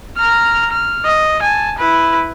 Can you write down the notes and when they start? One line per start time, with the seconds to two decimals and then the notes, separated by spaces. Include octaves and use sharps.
0.17 A#5 F6
0.72 F6
1.05 D#5
1.42 G#5 A5
1.79 E4 B4